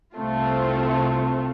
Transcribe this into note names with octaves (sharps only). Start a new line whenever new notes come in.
C2 C3 A3 C4 F4